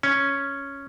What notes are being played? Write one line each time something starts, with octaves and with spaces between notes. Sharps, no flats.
C#4